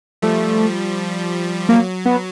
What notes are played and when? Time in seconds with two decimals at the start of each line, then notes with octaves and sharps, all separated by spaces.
0.22 F3 G3 A3
1.69 F#3 A#3
2.05 B3